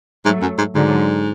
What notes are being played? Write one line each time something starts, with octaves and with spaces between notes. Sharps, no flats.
G#2 F#3 A3
F#2
G#2
G#2 D3 F#3